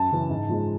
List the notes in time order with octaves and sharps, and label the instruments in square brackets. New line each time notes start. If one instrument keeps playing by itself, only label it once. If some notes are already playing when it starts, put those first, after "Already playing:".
Already playing: [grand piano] F#2 A5
C#3 E3
G#2
F3 G#3